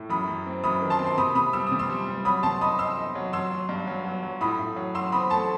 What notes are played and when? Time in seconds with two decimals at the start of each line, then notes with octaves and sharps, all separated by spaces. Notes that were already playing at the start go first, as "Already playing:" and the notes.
Already playing: A2
0.09 F#2 B5 D#6
0.28 F#2
0.46 C4
0.64 F#2 B5 D#6
0.82 D#3
0.90 A5 C6
0.99 C4
1.06 C6
1.18 C3 B5 D#6
1.35 C3 B5 D#6
1.53 G3 E6
1.67 C3 D#6
1.79 C6 E6
1.90 G3
2.07 G3
2.25 F#3 B5 D#6
2.43 C3 A5 C6
2.61 D#4 B5 D#6
2.79 D#4 C6 E6
2.97 D#4
3.15 F#3
3.33 F#3 C6 E6
3.51 F#3
3.69 G2
3.87 F#3
4.05 F#3
4.23 F#3
4.41 A2 B5 D#6
4.59 A2
4.76 F#3
4.95 F#3 C6 E6
5.12 C4 B5 D#6
5.30 A3 A5 C6